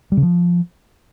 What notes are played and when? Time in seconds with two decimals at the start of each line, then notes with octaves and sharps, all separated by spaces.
0.12 G3
0.17 C#3
0.23 F3